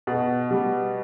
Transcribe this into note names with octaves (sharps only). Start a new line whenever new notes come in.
B2
G3